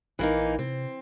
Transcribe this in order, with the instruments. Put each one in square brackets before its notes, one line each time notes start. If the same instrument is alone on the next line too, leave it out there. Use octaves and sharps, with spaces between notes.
[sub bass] A#1 [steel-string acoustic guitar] E3 A#3 D#4
[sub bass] C3 [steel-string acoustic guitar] C4